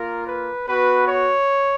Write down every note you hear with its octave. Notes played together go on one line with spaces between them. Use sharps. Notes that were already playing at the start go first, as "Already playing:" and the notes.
Already playing: A#3 F4 A#4
B4
B3 F#4 B4
C#5